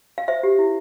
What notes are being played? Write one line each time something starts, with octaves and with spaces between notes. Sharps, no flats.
F5
C5 E5
G4
E4